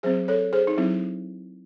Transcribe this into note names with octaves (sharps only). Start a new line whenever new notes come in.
F#3 C4 G#4 C5
A4 C#5
G#4 C5
D#4
F#3 C4 E4